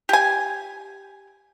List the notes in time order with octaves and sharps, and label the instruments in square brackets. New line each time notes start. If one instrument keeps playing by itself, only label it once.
[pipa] G4 G#5